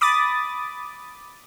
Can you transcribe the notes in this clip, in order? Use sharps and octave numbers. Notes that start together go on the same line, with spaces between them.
B5 D6 D#6 A6